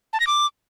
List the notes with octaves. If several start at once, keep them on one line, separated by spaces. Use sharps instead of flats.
A5
A#6
D6